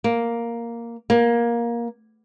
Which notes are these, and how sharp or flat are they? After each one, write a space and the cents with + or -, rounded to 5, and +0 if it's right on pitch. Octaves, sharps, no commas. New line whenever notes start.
A#3 +0
A#3 +15